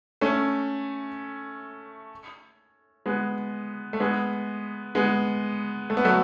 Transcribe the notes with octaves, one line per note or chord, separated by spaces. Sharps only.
A3 C#4
G#3 B3
A3
G#3 B3
G#3 B3
A3
B3
F#3 A3